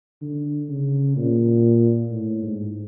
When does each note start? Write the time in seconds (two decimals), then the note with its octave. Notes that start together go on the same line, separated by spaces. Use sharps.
0.22 D3
0.69 C#3
1.16 A#2
2.11 A2
2.43 G#2